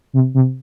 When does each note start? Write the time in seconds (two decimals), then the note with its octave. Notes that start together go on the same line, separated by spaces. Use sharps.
0.13 C3
0.34 C3